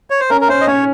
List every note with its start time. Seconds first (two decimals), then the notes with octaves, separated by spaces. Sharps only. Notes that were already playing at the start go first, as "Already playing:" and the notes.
0.10 C#5
0.20 C5
0.30 C#4 A#4
0.41 A#4
0.48 C#4 C5
0.61 D#5
0.67 C#4 C#5